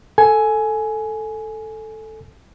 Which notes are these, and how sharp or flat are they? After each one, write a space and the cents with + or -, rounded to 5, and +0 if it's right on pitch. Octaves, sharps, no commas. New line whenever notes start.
A4 +0 G#5 +15